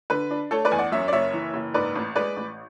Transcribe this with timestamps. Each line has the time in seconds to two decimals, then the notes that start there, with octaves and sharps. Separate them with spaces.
0.10 D3 B4
0.31 D4
0.51 A3 A4 C#5
0.65 B4 D5
0.72 E2 G#5
0.78 D5 F#5
0.92 F#2 C#5 E5
1.08 D5
1.13 F#1 C#5 E5
1.33 E3
1.54 F#1
1.74 G#2 B4 D5
1.95 A1
2.16 G#3 B4 D5
2.36 A1